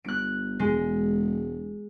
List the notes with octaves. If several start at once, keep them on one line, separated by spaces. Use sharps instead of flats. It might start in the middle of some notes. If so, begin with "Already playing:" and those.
G1 F#6 D7
E1 G#3